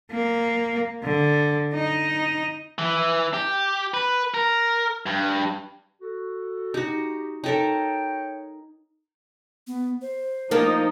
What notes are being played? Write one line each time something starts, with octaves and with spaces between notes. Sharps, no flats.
A#3
D3
D#4
E3
G4
B4
A#4
G2
F#4 A4
D#4 F#4 G4
D#4 A4 A#4 C#5 G5
B3
C5
F3 A#3 D#4